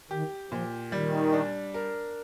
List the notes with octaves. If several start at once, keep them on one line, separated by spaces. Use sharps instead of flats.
D#3 G4
A#2 F3
D#3 G3
D4
A#4